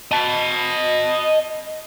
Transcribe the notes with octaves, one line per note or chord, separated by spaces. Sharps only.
D#5 A5